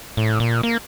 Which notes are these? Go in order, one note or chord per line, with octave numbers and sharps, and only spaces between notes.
A2
A#2
A#3